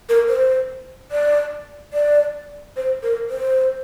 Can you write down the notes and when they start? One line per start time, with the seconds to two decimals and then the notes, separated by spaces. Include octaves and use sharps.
0.09 A#4
0.29 C5
1.12 D5
1.93 D5
2.77 C5
3.03 A#4
3.30 C5